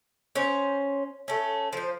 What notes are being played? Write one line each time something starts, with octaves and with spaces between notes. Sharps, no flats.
C#4 C5
A3 C#4
F3 C5